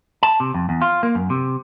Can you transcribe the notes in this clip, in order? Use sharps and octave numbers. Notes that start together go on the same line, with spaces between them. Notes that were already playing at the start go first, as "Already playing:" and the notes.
A5
C3
F2
E2
F4
A#3
F#2
C3